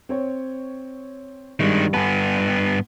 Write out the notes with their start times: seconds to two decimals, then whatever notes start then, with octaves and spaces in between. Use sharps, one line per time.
0.09 C4 C#5
1.60 G2 D#3 G3 G#3 C#6
1.94 G2 B3 G#5 A5 B5